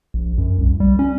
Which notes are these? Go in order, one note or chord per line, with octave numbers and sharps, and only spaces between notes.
A#1
F#2
C2
G3
C#4